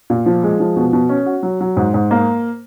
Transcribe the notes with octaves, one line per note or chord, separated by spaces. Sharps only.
A#2
F3
G#3
F3
B2
B2
C#4
F#4
F#3
F#3
G#2
G#2
A#3